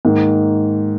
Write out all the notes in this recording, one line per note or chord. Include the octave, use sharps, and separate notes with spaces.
G#2 D#3 A#3